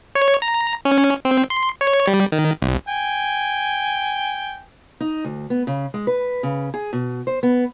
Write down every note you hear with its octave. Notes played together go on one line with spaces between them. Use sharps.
C#5
A#5
C#4
C4
C6
C#5
G3
D#3
C2
G5 G#5
D#4
D2
B3
C#3
G#3
B4
C#3
G#4
B2
C5
B3